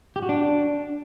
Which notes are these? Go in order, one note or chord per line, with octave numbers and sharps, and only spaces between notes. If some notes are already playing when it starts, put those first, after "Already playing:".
G4
F#4
D4